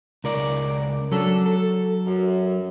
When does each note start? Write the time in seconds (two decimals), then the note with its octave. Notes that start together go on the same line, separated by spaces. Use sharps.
0.24 C#2 A#4 D5
1.11 F#3 C#4 D4 A4
1.45 A4
2.07 F#2